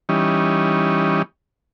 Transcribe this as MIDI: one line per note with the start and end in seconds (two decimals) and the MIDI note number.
0.09 1.22 52
0.09 1.22 55
0.09 1.22 61
0.09 1.22 63